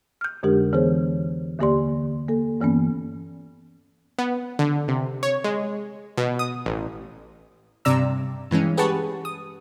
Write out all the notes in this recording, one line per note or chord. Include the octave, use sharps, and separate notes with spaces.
F6 G6
F2 D3 G#3 D4 G4 A#4
E3 B3 G#4 C5 C#5
D#2 D3 A#3 G4 D5 C6
A#3 A4
G2 E3 A#3 B3 C#4
B3
D3
C3
C#5
G#3
B2
D#6
A1
G2 C3 D5 A#5 E6
G2 E3 G#3 C#4
G4 G#4 B4 F#5 A5 C#6
D#6